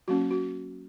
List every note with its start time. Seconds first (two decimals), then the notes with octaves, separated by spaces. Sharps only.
0.08 F#3 A#3 C#4 F#4
0.31 F#4